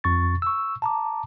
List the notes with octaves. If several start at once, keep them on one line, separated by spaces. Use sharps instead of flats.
F2 C#6 A6
C#6 E6
A5 A#5 D6